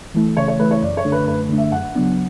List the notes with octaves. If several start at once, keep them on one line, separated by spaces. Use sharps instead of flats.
E3 A3 E4
C#3 C#5
C#5
E3 A3 E4 B4
C#5
F#2 D5
C#5
D3 A3 D4
B4
F#2 B4
D3 A3 D4
E5
F#2 F#5
C#3 F#3 B3 D4